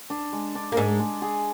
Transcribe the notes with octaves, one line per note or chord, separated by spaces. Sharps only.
D4
G#3
D4
A#3
G#2 G#3 G#4
G#3
G#4